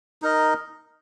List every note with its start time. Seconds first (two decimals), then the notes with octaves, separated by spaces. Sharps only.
0.22 D#4 A#4 D#5